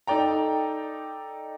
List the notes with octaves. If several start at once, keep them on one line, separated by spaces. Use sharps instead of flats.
D#4 A4 D5 G5 A#5